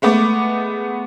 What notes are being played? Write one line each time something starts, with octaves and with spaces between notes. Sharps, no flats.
G#3 A3 B3 D6